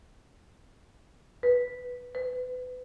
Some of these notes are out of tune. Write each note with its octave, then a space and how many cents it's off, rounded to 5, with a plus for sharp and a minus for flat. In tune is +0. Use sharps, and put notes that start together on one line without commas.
B4 +0
B4 +30